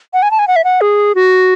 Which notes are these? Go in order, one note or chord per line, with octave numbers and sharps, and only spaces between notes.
F#5
G#5
A5
G#5
F#5
E5
F#5
G#4
F#4